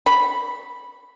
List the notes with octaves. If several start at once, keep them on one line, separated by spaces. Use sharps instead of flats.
B5